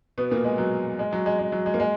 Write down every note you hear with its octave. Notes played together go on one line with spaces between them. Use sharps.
B2 B3
A#2 A#3
G#3
F#3
G#3
F#3
G#3
G#3
F#3
G#3
A#3
G#3